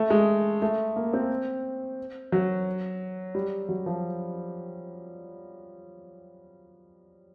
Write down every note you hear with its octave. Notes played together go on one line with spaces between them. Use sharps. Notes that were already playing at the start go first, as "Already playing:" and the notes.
Already playing: A3
G#3
A3
A#3
C4
F#3
G3
F#3
F3